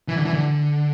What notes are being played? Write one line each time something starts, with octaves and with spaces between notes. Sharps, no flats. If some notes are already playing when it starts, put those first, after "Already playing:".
E3
D3
E3
D3